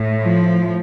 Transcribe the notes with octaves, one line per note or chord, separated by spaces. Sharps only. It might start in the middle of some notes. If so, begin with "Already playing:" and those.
Already playing: A2
F3